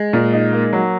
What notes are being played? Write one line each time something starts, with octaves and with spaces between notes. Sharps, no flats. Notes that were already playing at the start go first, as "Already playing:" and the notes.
Already playing: G#3
A#2
D#4
A#3
F#3